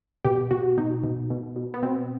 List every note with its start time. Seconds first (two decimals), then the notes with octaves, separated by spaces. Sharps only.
0.25 B2 G4
0.51 B2 F#4
0.77 B2 D#4
1.04 B2
1.30 B2
1.56 B2
1.74 B3
1.83 B2 C4